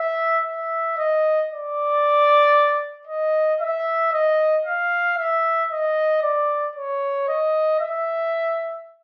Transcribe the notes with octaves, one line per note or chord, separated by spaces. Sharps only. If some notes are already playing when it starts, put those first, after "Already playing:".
Already playing: E5
E5
D#5
D5
D#5
E5
D#5
F5
E5
D#5
D5
C#5
D#5
E5